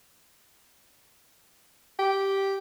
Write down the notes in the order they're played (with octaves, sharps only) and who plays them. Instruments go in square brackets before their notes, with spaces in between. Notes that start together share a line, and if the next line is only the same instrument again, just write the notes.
[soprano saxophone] G4